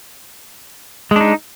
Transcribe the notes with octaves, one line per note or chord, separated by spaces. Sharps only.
G#3 D4 D#4